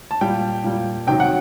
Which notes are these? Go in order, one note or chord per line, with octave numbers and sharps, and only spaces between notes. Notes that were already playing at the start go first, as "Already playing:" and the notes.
A5
A#2 G3 G5
A#2 G3
C3 D#3 F#3 G5
F#5